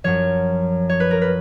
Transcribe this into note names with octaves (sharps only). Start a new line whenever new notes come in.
F#2 F3 C#5
C#5
B4
A#4
B4